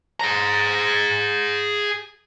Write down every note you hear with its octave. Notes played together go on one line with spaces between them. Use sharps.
G#4 A#5